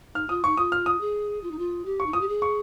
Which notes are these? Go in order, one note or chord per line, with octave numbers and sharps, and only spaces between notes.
D#4 F6
F4 D#6
D#4 C#6
F4 D#6
F6
D#6
G#4
F4
D#4
F4
G4
C#6
D#4
F4 D#6
G4
G#4
C#6